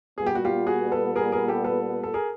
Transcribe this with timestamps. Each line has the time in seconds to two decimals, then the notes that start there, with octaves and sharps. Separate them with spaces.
0.18 A#2 G3 B3 G#4
0.26 G4
0.35 F#4
0.45 F4 G4
0.67 F#4 G#4
0.92 A4 B4
1.16 G#4 A#4
1.32 G#4 A#4
1.48 G4 A4
1.64 A4 B4
2.03 A4
2.14 G#4 A#4